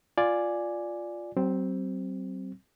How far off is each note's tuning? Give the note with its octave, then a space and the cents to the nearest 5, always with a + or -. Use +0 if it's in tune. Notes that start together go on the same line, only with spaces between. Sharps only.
F4 +0 D5 +0 G#5 +0
F#3 +45 C4 +0